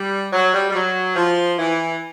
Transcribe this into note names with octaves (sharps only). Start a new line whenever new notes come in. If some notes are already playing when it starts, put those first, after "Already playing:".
Already playing: G3
F#3
G3
G3
F#3
F3
E3